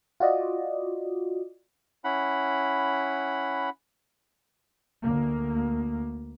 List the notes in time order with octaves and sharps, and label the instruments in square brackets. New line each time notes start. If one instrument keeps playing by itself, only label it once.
[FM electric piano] F4 F#4 D5 D#5
[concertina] C#4 E4 F#5 B5
[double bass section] D2 A#3